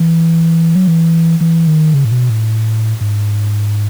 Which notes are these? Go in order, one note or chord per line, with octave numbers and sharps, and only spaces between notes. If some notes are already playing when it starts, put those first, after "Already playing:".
Already playing: E3
F#3
E3
E3
D#3
C#3
A2
B2
A2
G#2